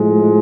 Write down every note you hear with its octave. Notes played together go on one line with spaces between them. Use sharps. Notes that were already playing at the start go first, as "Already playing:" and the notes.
Already playing: A2 F3 G#3